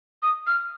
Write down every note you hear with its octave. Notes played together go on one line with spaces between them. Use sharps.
D#6
F6